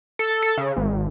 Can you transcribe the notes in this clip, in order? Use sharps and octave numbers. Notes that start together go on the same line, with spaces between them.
A4
A4
C#3
G#1